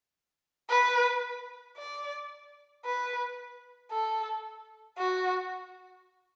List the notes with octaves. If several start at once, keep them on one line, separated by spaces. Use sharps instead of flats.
B4
D5
B4
A4
F#4